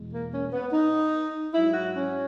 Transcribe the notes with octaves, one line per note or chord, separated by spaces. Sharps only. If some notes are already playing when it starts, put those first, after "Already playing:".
Already playing: E2 B2 G#3
A#3
C#4
B3
D#4
G#2 F#3 E4
F#4
C#4